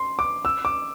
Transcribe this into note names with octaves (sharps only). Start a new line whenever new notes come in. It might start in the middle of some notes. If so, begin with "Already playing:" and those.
Already playing: C6
D6
E6
D6